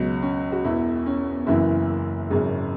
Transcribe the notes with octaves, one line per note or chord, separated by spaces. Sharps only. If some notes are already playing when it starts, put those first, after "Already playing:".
Already playing: C#2 B2 F#3
C#4
F#4
E1 E2 B2 E4
C#4
F#1 F#2 E3 E4
G#1 F#2 C#3 G#3